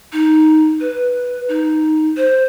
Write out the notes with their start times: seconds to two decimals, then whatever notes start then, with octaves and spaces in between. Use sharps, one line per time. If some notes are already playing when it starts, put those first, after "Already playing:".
0.13 D#4
0.80 B4
1.49 D#4
2.17 C5